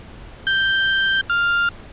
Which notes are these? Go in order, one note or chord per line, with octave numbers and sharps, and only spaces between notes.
G6
F6